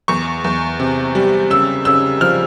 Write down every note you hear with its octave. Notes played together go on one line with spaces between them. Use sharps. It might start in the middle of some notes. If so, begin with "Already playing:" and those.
E2 C#6
E2
C3
G3
C#3 E6
C#3 E6
F3 F6